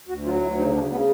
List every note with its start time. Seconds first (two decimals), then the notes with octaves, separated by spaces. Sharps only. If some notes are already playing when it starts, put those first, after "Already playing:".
0.09 D2 F#4
0.25 F#3 F4
0.42 D2 E4
0.58 C#3 D#4
0.74 C#3 D4
0.91 C#3 B3